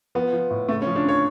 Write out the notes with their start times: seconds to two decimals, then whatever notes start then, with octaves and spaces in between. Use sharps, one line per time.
0.15 F3 B3
0.33 F3
0.50 A2
0.68 C#3 A3
0.82 C#4
0.87 F3
0.95 D4
1.04 C#3 C#5